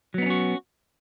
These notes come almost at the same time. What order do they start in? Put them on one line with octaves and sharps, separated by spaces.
F#3 B3 D#4 C#4 F#4